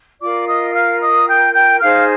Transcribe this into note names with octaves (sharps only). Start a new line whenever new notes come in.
F4 A#4 D5 D6
D#5 D#6
D#6
F5 F6
D#5 D#6
G5 G6
G5 G6
D#4 G#4 C5 F5 F6